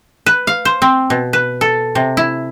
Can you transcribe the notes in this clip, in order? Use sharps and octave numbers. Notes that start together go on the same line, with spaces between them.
B4
F5
C5
C4
B2
B4
A4
C3
E4